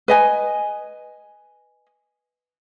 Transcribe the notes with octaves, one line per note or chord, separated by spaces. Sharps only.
B4 D#5 G#5